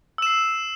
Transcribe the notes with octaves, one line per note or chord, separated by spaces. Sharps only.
E6 C7 E7